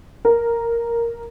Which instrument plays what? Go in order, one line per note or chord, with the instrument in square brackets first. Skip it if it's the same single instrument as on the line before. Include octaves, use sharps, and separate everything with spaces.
[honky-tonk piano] A#4